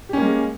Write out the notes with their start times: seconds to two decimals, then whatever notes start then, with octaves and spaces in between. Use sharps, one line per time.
0.09 G4
0.13 C#4
0.17 A#3
0.21 G#3